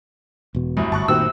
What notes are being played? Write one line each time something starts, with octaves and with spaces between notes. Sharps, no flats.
E1 B2
C2 F#2 A2
G1 A5 C#6 F#6
A#2 D#3 C4 F#4 G4 E6